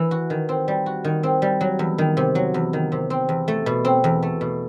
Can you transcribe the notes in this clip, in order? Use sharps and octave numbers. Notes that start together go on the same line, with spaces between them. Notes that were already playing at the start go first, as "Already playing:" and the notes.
Already playing: E3
F#4
D#3
C4
G3
F#4
D#3
C4
G3
F#3
E2
D#3
C3
F#3
E2
D#3
C3
C4
E2
A3
B2
C4
E2
A3
B2